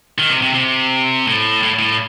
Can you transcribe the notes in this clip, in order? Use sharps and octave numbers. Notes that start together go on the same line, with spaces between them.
D#3
C3
C3
C3
A2
A2
A2